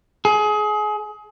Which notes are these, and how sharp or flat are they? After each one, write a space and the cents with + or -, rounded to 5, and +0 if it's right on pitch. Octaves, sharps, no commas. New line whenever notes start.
G#4 +25